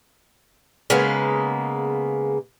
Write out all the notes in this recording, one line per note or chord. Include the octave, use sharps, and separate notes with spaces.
C#3 G#3 A#3 B3